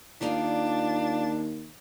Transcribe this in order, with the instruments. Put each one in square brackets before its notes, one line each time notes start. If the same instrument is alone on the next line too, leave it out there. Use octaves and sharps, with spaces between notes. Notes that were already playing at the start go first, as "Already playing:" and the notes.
[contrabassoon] D#2 [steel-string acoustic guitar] D#3 F4 D5 [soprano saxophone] D4